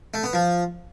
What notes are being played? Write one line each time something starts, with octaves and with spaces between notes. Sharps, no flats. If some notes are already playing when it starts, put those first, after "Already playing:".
A3
B3
F3